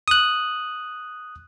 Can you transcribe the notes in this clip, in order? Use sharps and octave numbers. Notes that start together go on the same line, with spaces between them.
D#6 F#6